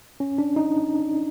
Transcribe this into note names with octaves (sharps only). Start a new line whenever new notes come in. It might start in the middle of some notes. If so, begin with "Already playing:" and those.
C#4
D4
D#4